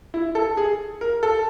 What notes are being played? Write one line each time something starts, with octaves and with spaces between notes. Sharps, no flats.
E4
A4
G#4
A#4
A4